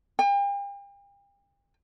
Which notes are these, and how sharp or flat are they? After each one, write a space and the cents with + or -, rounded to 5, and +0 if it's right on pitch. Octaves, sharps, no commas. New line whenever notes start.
G5 +40